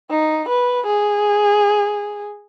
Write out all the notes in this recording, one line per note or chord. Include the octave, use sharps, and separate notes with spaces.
D#4
B4
G#4